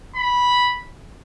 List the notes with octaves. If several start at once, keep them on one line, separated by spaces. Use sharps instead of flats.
B5